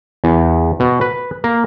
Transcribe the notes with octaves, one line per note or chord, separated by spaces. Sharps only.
E2
B2
B4
A#3